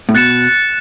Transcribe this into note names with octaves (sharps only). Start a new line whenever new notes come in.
A2
B2 F#6 A6 C#7 E7